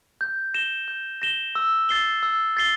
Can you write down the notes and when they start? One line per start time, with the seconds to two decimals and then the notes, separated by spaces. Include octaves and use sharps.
0.21 G6
0.54 A#6 E7 G7
0.88 G6
1.22 A#6 E7 G7
1.55 E6
1.89 A6 C7 G7
2.23 E6
2.57 A6 C7 G7